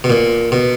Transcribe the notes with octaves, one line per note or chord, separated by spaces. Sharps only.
B2
A#2
B2